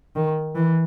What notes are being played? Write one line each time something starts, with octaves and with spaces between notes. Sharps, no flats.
D#3
E3